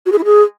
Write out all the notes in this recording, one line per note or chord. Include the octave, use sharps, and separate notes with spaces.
F#4
G#4
E4
G#4